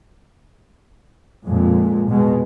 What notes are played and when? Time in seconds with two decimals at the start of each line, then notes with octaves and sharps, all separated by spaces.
1.45 F2 A#2 G#3
2.08 B2 G#3